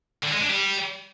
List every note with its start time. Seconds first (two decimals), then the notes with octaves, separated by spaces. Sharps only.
0.23 D3
0.32 G#3
0.40 D4
0.49 G3